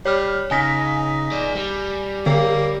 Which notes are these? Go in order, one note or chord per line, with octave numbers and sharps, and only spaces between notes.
G3 C#5 F6
C#3 D#4 G#5 A#6 B6
G#4 D5
G3
D3 A#3 C7